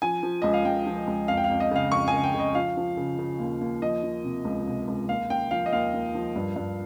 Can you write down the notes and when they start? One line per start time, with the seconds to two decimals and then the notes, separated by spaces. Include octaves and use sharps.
0.02 F3 G#5
0.23 F3
0.42 C#2 D#5
0.53 F5
0.65 C#2 G5
0.86 F3
1.08 C#2
1.28 F2 F5
1.37 G5
1.44 F5
1.50 F2
1.60 D#5
1.71 C#3 F5
1.91 F2 C#6
2.08 G#5
2.14 C#3
2.24 G5
2.34 C#3
2.40 D#5
2.55 F3 F5
2.77 F3
2.97 C#3
3.19 C#3
3.40 D#2
3.61 D#2
3.82 F3 D#5
4.03 F3
4.24 C3
4.45 C#2
4.67 C3
4.88 C#2
5.09 D#2 F5
5.30 D#2 G5
5.51 F3 F5
5.66 D#5
5.73 D#2 F5
5.93 D#2
6.15 F3
6.36 G2
6.56 G2